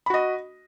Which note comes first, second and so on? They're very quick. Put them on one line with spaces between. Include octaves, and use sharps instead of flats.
B5 F#4 D#5